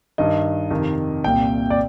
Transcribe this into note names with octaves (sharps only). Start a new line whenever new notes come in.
G2 D#3 D#5
F2 C3 D#3
C2 A#2 G5
D5